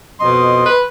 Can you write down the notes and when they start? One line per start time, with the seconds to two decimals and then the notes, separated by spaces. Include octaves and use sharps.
0.20 F2 B2 D#5 C6
0.66 B4